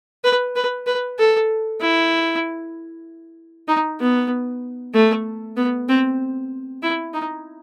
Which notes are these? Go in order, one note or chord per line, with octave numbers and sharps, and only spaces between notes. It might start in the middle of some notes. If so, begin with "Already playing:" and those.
B4
B4
B4
A4
E4
D#4
B3
A3
B3
C4
E4
D#4